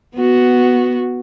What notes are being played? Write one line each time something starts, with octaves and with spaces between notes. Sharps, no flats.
B3 F#4